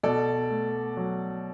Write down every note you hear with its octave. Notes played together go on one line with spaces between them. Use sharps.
B2 A4 D5
A3
F#3